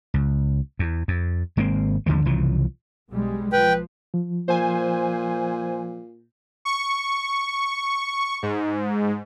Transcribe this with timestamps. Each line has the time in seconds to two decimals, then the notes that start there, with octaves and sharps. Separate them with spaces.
0.14 C#2
0.79 E2
1.08 F2
1.57 G#1 G#3 A#3 C4
2.06 D#2 D3 F3 G#3
2.25 C2 C#3 E3 F3
3.11 B1 G3 G#3
3.53 F3 B4 G5
4.14 F3
4.48 A#2 C5 G#5
6.65 C#6
8.43 G#2